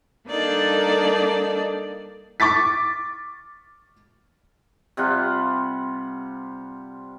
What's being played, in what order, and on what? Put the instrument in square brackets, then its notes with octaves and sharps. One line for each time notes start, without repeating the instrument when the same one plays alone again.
[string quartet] G3 A#3 D4 D#4 A4 D5
[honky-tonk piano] C#6 D6 A6 B6
[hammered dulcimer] C3 G3 F4 F#5